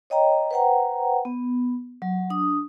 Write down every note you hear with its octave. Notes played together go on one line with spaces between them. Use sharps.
C#5 D#5 G5 A#5
B4 C5 F#5 G5 A#5
B3
F#3
D4 D#6